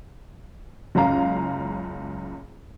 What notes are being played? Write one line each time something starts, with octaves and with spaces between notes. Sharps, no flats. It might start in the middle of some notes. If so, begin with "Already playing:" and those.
F#1 C#2 C#4 F5 A#5